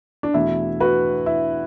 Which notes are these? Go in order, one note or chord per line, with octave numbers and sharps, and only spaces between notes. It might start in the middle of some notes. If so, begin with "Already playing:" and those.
D4
E2 B2 A3 E4
F#4 B4
E4